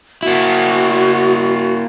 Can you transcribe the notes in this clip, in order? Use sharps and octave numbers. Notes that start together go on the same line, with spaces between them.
A#3 E4 F#4